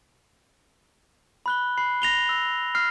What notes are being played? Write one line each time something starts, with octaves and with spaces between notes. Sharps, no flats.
B5 F#6 G7
B5 C7
A#6 F7 G7
E6
F6 C7